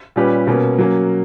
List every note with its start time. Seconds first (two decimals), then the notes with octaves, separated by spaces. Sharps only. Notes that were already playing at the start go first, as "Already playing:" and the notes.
0.16 A#2 G3 C#4 G4 B4
0.47 B2 A#3 C#4
0.79 F#3 A#3 C#4